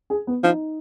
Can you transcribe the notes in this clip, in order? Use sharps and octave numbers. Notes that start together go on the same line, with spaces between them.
G#4
B3
F3 D#4